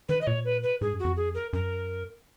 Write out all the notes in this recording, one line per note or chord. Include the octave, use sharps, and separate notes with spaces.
D#3 B4
D#5
A#2 C#5
B4
B4
G#2 G#4
F#2
F#4
F2
G#4
A#4
F#2 A#4